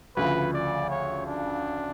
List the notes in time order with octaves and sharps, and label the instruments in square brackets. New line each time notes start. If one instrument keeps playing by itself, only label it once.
[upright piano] D2 C#3 F3 [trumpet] B4
[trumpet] D5
C#5
D4